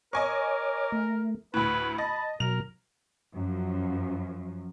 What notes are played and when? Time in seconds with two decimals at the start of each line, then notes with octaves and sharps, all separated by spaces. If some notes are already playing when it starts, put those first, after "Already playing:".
0.13 A#4 C#5 D#5 G#5 C#6 D6
0.92 A3
1.54 D2 A2 B4 B5
1.98 D#5 A5
2.40 B2 F#3 A#4 F7
3.34 F#2 F3